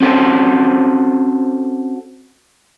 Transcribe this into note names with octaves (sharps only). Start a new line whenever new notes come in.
C4 C#4 F#4 A4 C5